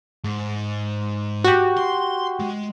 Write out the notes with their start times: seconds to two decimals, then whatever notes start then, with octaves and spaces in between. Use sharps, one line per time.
0.24 G#2
1.44 F#4 G4
1.77 C6
2.40 G#3